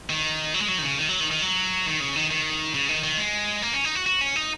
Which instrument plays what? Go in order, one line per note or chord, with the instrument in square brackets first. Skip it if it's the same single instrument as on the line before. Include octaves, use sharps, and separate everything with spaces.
[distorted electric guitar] D#3
F#3
G#3
F#3
D#3
C#3
D#3
F#3
D#3
D#3
F#3
D#3
C#3
D#3
D#3
C#3
D#3
D#3
G#3
A#3
C#4
D#4
F#4
F#4
C#4
D#4